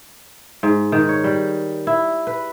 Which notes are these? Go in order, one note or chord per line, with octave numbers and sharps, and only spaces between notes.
G#2
D#3
C#5
G3
E4
B4